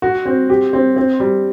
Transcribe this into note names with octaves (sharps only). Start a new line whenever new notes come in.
F#4
C4
G4
C4
C4
G3